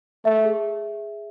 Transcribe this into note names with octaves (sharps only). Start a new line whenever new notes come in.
A3 E5
G#4